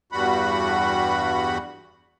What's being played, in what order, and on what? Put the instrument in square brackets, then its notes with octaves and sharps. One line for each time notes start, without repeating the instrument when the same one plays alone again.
[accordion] E2 G2 G3 F#4 F#5 B5